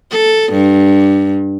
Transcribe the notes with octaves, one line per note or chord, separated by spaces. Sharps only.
A4
G2